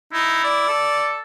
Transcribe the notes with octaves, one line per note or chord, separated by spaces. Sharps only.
D#4 E4
D5
A4